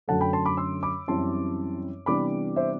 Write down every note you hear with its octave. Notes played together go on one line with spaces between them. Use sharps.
F#2 D3 F#3 A3 F#5 A5
G5 B5
A5 C6
B5 D6
C6 E6
B5 D6
F#2 E3 G3 C4 E4 A5 C6
C3 E3 G3 B3 D4 B5 D6
C5 E5